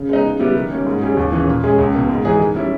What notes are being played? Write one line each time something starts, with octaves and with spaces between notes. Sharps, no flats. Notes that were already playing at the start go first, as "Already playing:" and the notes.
Already playing: C#3
G#3 B3 D#4
C#3
G3 B3 E4 G4
D#3
G3 A#3 C#4
G#2
G3 C#4 G#4
D#2
C#3 E3
A#2
G#3 C#4 G#4
C#2
B2 A#3
G#2
E3 G#3 D#4 G#4
D#3
G3 C#4 E4